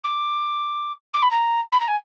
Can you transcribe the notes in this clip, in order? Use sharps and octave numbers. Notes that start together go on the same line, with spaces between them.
D6
D6
B5
A#5
B5
A#5
G#5